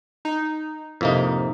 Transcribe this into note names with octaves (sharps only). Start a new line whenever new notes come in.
D#4
F2 A2 C3 A#3 D#4